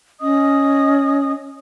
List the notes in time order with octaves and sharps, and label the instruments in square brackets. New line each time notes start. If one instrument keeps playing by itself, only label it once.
[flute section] C#4 D#5 D#6